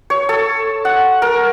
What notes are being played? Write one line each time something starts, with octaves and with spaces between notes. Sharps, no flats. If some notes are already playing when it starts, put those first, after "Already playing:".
C#5
A4
F#5
A#4